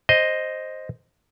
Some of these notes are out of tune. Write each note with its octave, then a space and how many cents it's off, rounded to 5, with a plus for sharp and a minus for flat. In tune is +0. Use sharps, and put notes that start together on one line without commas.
C5 +5 D#5 +0